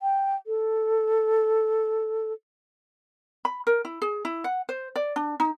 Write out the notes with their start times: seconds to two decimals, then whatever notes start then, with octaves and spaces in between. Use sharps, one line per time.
0.02 G5
0.47 A4
3.45 B5
3.67 A#4
3.85 E4
4.02 G#4
4.25 E4
4.44 F#5
4.69 C5
4.96 D5
5.16 D4
5.40 D#4